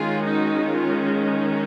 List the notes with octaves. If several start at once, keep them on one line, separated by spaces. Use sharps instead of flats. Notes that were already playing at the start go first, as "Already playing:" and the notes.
Already playing: D#3 G#3 C#4 F4 G#4
D#4 F#4
F4